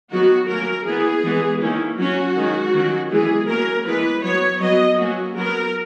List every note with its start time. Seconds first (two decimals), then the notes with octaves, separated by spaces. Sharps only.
0.11 D#3 F#3 B3 F#4
0.48 F#3 A#3 C#4 A#4
0.85 E3 B3 G#4
1.24 E3 G#3 B3
1.60 D#3 A#3 C#4 E4
1.98 F#3 C#4 F#4
2.36 D#3 G#3 C#4
2.73 D#3 F#3 C#4
3.11 E3 G#3 B3 G#4
3.48 F#3 A#3 C#4 A#4
3.85 E3 G#3 B3 B4
4.23 F#3 B3 C#5
4.61 F#3 B3 D#5
4.98 F#3 A#3 C#4 F#4
5.36 F#3 B3 A#4